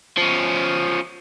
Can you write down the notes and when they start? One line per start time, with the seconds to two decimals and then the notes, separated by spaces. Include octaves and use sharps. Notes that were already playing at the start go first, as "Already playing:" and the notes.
0.17 F3 C#4